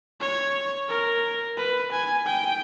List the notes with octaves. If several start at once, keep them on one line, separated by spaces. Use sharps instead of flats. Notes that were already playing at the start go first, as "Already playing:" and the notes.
C#5
A#4
B4
G#5
G5